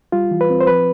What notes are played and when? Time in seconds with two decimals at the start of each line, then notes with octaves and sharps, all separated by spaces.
0.12 G3 F4
0.31 E3
0.41 B4
0.50 C4
0.61 C5
0.67 F3 B4